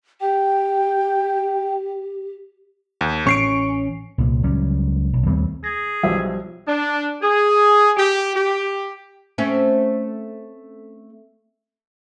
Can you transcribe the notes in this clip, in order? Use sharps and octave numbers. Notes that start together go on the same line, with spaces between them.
G4 G5
D#2
A1 C#4 C#6 C7 D7
C2 A#2
C#2 F#3 G3 C#4
B1
D#2 G3 A3 C4
G#4 A#6
B1 F3 G3 G4 E5
D4
G#4
G4
G4
A3 C4 C#4